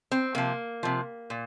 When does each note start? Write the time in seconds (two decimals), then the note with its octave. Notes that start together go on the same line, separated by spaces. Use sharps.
0.11 C4
0.35 C3 F3 A#3
0.83 C3 F3
1.30 A#2